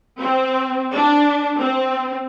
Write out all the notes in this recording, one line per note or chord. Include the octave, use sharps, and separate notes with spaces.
C4
D4
C4